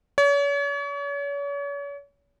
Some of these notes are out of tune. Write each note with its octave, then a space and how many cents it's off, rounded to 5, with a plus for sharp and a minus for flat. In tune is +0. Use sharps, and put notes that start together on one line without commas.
C#5 +40